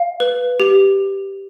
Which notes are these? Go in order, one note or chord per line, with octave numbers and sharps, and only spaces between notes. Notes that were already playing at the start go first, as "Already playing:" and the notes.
Already playing: F5
B4
G4